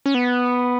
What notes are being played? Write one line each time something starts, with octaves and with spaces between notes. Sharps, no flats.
C#4
B3